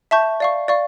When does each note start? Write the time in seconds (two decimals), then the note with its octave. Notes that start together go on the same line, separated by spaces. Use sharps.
0.11 E5 A5 C#6 G6
0.40 D5 F5 C#6
0.68 D5 F5 C#6